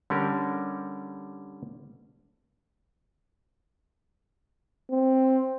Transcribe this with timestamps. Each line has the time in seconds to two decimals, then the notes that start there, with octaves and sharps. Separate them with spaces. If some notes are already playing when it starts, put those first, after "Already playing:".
0.10 D3 G3 C#4 A#4
4.91 C4